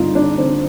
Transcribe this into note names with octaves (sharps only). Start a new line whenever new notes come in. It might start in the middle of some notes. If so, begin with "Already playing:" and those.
Already playing: G2 D3 D#4 F4
G2 D4
D3 C4